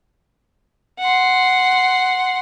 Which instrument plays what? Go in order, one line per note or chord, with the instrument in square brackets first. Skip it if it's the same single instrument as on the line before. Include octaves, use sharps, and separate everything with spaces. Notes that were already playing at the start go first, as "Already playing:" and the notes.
[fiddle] F#5 C6